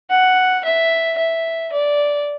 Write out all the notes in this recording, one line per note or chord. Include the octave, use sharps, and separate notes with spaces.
F#5
E5
E5
D5